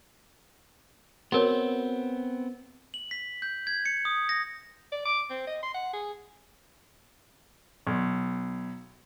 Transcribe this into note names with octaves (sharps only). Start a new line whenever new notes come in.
B3 C4 F#4 A#4 C#5
F#7
B6
G6
G#6
C#7
D#6
A#6
D5
D6
C4
D#5
C6
F#5
G#4
B1